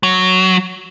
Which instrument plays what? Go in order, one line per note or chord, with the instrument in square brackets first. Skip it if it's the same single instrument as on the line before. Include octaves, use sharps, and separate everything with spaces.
[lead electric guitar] F#3